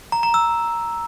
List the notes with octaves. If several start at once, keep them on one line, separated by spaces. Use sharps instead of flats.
A#5
A#5
E6